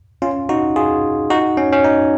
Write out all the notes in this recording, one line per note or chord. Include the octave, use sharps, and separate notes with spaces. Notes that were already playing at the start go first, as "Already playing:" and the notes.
C#4 F4
D#4 F#4
F4 G#4
D#4 F#4
C#4
C#4
D#4